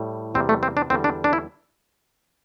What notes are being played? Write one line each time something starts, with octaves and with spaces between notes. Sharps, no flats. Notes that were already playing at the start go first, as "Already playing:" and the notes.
Already playing: A2 G3
E2 C3 G3 C4
A3
C4
D4
E2 D3 G3 C4
D4
D4
E4